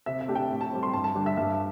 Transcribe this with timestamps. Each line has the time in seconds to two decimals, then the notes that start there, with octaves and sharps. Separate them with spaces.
0.06 C3 E5
0.21 E5
0.28 A3 D4 G4
0.36 G5
0.50 A2
0.61 A5
0.72 G3 C4
0.83 C6
0.93 G2 A5
1.04 A5
1.15 D3 G3 D4 G4
1.26 E5
1.37 G2 E5